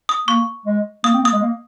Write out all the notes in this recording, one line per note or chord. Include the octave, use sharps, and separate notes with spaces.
D#6
A#3 C#6
G#3
A#3 D#6
C4
A#3
D#6
G#3
A#3